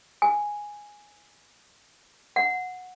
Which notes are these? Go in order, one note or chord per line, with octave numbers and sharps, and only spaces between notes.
G#5
F#5